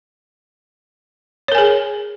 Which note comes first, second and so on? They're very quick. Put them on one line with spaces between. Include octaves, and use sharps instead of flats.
C#5 A#4 G#5 G#4